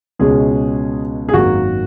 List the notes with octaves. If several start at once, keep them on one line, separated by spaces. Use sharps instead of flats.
C#2 B2 G#3 C#4 G#4
G#4
G#1 F#2 D#3 A#3 F#4